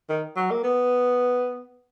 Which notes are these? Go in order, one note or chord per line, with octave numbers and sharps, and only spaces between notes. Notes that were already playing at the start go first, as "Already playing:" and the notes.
D#3
F#3
A#3
B3